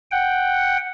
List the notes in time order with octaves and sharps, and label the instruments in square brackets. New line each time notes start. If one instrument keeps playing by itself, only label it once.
[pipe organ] F#5 G5